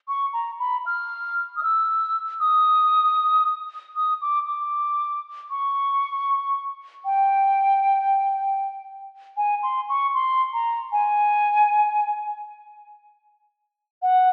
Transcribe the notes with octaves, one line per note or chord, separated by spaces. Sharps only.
C#6
A#5
B5
F6
D#6
E6
D#6
D#6
D6
D6
C#6
G5
G#5
C6
C#6
C6
A#5
G#5
F#5